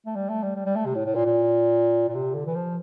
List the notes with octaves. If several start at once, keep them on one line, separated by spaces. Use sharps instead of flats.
A3
G3
A3
G3
G3
G3
A3
C3
A2
A2
A#2
A#2
A#2
C3
D3
E3
F3